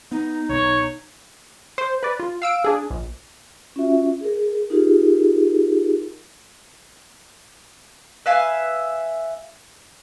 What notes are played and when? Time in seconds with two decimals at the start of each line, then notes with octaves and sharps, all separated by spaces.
0.11 B3 D#4
0.49 B1 B2 C#5
1.78 C5
2.03 B4 D5
2.20 F4
2.42 F5 E6 D7
2.64 D4 G#4
2.91 A#1
3.76 C#4 F4 F#4 E5
4.21 G#4 A#4
4.70 D#4 F4 G4 G#4 A#4
8.26 B4 E5 F5 G#5